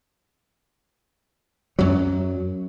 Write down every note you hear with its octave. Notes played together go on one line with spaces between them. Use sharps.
F#2 F#3